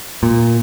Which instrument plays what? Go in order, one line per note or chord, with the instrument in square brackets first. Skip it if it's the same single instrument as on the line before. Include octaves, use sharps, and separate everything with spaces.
[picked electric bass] A#2